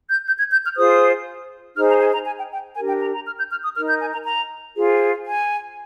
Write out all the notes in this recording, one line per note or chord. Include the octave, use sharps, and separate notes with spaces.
G6
G6
G#6
G6
F6
F4 G#4 C5 D#6
D#4 G#4 C5 F6
A#5
G#5
A#5
G#5
G5
G5
D4 G4 A#4 G#5
G5
A#5
A#5
F6
G6
F6
D#6
D#4 A#4 F6
G6
G#5
A#5
A#5
F4 G#4 C5
G#5